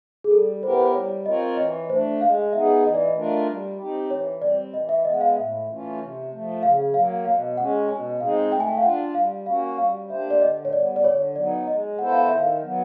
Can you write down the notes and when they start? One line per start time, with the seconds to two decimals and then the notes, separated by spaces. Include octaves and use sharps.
0.24 G#4
0.31 G3 A4
0.63 B3 E4 G4 A#4 C5
0.70 B4
0.77 C5
0.94 G3 C#5
1.26 C4 F4 A#4 C#5 D#5
1.57 E3 D#5
1.89 A3 D4 C5
2.21 G#3 F5
2.53 B3 D#4 G#4 E5
2.84 E3 D#5
2.94 D5
3.05 D#5
3.15 A3 D4 F4 A#4
3.47 G3
3.78 C4 D#4 G4
4.10 E3 C#5
4.41 G3 C4 D5
4.74 E3 D#5
4.89 E5
5.05 G#3 B3 D#5
5.14 F#5
5.21 F5
5.36 A2 E5
5.67 E3 A3 C#4 F4
5.99 C3
6.31 F3 A3
6.63 C#3 F5
6.94 F#3 A#3 F5
7.25 B2 F5
7.57 G#3 C#4 F#5
7.89 B2 G#5
8.20 G#3 C4 D#4 G#4 F5
8.52 A3 G5
8.60 G#5
8.69 G5
8.77 F5
8.83 D4 F4 F#5
9.15 G3 F5
9.46 A#3 C#4 F#4 F5
9.78 G3 F5
10.09 A#3 D4 G4 C5 E5
10.30 D5
10.41 D3 D#5
10.65 C#5
10.73 G3 B3 D5
10.96 D5
11.04 D3 C#5
11.36 F#3 B3 D#4 D5
11.68 G#3 D#5
11.99 B3 E4 A4 C5 F#5
12.12 F5
12.26 D#3 E5
12.40 F5
12.62 F#3 B3